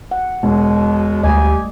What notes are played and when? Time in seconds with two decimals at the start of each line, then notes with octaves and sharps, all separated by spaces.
0.11 F#5
0.43 E1 B2 G#3
1.23 D2 G3 A3 G4 D#5 G#5